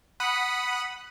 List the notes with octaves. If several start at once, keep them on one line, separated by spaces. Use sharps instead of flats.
F#5 B5 D#6